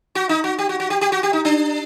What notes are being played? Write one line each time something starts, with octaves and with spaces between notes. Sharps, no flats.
F#4
D#4
F#4
G4
F#4
F#4
G4
G4
F#4
G4
D#4
D4